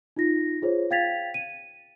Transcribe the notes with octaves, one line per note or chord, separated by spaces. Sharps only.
D#4 F4 A#6
F4 G#4 C5 C#5
F5 G5 G#6 A6 B6 F7
D#7